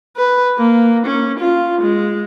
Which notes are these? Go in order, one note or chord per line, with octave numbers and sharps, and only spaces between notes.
B4
A#3
C#4
F4
G#3